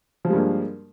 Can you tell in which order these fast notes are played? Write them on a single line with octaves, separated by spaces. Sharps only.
F3 G3 G#3 G2 A#3